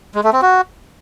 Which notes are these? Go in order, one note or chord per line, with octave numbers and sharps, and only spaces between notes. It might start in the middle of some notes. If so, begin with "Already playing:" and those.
G#3
A3
C4
F#4